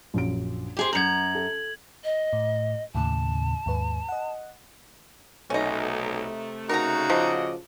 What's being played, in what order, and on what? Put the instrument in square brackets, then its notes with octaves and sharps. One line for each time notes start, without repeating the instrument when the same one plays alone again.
[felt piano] A#1 F#2 D7
[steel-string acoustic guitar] G4 G#4 C5
[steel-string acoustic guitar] F#2 A#5 [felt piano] G6 C#7 [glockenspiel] G#6 F#7
[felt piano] A4
[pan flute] D#5
[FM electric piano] A2
[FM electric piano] D#2 A2 C#3 [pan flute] A5
[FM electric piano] D#2 G#2 B4
D#5 F#5
[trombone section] B1 [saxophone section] C3 A3 [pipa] C#4 D#4
[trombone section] C#3 F#4 [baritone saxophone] D#4 [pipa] A#4 A#5
[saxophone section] A2 D5 D#5 [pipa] F3